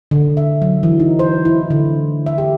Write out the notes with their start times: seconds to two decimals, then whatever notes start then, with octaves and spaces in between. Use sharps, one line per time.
0.11 D3
0.37 E5
0.62 F#3
0.83 E3
1.00 D#4
1.19 C5
1.45 E4
1.70 D3
2.26 E5
2.38 G4